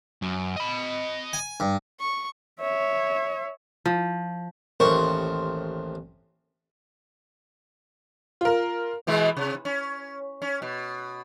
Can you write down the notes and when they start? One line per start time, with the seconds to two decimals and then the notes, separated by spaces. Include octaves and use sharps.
0.22 F#2
0.56 D#5 B5
1.33 G#5
1.60 G2
2.00 C#6
2.60 C#5 E5
3.85 F3
4.80 A1 D#2 A#4 C5 C#6
8.41 F4 A#4
9.07 B2 E3 G#3
9.37 C3
9.65 C#4
10.42 C#4
10.62 B2